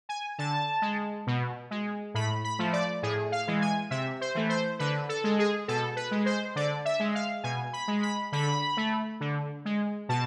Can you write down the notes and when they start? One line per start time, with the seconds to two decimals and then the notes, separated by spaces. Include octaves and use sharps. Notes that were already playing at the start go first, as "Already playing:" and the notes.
0.09 G#5
0.38 D3 A5
0.82 G#3
1.27 B2
1.71 G#3
2.14 A2 B5
2.44 B5
2.59 F3 A3
2.73 D5
3.02 A2 G#4
3.32 F5
3.47 E3 G#3
3.62 G#5
3.91 C3 E5
4.21 C5
4.35 E3 A3
4.49 C5
4.79 D3 B4
5.09 A4
5.24 G#3
5.39 G#4
5.68 B2 A4
5.96 B4
6.11 G#3
6.26 C5
6.55 D3 D5
6.85 E5
7.00 G#3
7.15 F5
7.43 B2 G#5
7.73 B5
7.88 G#3
8.03 B5
8.32 D3 B5
8.77 A3
9.20 D3
9.65 G#3
10.09 B2 A5